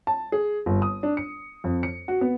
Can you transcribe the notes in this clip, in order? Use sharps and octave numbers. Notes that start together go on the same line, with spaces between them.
A5
G#4
G1
D#6
D4
C#7
F2
C#7
F#4
B3